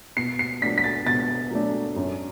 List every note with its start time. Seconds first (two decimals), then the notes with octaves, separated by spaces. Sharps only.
0.17 B2 C7
0.39 C7
0.62 F#3 A3 D4 B6
0.78 B6
0.84 A6
1.06 B2 A6
1.51 F#3 A3 D4
1.96 F#2